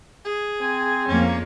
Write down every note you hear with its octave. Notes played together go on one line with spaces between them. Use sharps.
G#4
C4 G#5
F2 A#3 C#4